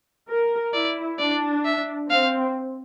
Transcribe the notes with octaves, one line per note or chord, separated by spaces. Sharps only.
A#4
E4 D5
D4 D5
E5
C4 F5